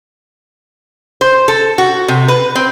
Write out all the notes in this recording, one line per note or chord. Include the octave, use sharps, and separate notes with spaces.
C5
A4
F#4
C3
B4
C4